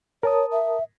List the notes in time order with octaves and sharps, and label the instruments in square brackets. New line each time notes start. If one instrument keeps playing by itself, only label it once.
[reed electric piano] A#4 A5 D#6 [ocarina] C#5
[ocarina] E5